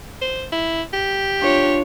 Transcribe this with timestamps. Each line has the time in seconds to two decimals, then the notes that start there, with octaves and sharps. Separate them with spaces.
0.21 C5
0.52 E4
0.93 G4
1.39 D4 F4 C#5